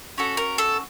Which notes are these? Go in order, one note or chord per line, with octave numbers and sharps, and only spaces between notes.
C#4 F#4 A4
A#4
A4